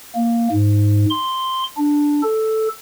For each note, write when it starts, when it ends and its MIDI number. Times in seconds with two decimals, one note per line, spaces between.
0.15 0.48 58
0.52 1.05 44
1.10 1.63 84
1.77 2.22 62
2.23 2.68 69